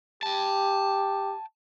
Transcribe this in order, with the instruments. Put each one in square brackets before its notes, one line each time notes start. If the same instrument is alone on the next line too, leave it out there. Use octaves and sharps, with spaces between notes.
[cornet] G4 [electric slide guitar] G5 A5